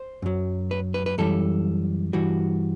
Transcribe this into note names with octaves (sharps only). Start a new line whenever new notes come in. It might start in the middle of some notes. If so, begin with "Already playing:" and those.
Already playing: C5
F#2 F#3
B4
B4
B4
F#2 E3 G3 A4
G2 E3 G3 F#4